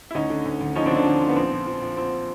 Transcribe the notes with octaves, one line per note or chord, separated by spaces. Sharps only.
E4
D2 C#4 D#4
D3
D2
D2
F3 C#4 D#4
C4 D4
D3
C4 D4
D3
F3
B3
A#1 C4
F3
F3
F3
A#1 C4